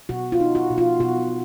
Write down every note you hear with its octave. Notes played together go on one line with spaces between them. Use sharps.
B2 F#4
F4
D#4
F#4
B2
F4
B2 F#4